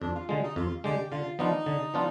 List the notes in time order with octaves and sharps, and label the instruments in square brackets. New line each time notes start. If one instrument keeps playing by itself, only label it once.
[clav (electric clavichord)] F2 [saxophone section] D4
[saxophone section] F4
[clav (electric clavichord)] D3 G#3 [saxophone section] F4
[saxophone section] D#4
[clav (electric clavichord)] F2 [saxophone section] F4
[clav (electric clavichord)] D3 G#3 [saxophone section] G4
[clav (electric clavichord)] D3 [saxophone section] F4
[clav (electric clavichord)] F3 B3 D4 F4 [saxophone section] D#4
[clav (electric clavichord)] D3
F3 B3 D4 F4